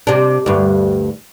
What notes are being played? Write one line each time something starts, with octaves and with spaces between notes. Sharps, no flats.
C3 D4
D2 G2